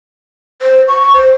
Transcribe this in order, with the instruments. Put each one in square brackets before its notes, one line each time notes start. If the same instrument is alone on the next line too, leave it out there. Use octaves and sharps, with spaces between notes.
[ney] C5
C#6
C5